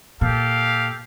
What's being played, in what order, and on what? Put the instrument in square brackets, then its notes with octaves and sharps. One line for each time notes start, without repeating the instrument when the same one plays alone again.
[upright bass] A#2 [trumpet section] G4 A4 F5